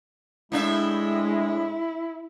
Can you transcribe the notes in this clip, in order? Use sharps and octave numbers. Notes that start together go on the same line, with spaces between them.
A2 G#3 D4 E4 E5